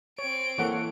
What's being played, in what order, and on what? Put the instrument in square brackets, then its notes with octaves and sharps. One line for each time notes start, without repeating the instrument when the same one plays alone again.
[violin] C4 D7 [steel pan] C#5
[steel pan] E3 A#3 A4 [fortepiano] C#5 F#5